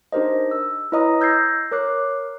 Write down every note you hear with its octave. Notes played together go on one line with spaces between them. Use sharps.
D4 D#4 G4 A#4 C5 D#5
E6
E4 B4 C#5 D#5 A#5 D#6
E6 G6 G#6 A#6 C7
A#4 C#5 D6 F#6 C7